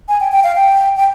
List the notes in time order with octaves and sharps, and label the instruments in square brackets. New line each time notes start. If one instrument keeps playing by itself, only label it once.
[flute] G#5
G5
G5
F5
G5
G5